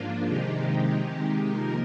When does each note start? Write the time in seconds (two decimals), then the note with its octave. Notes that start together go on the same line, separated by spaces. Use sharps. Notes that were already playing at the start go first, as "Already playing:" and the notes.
Already playing: G#2 F3 A#3 D4 F4
0.26 C3 D#3 G#3 D#4 G4
1.50 F3 A#3 D#4 A#4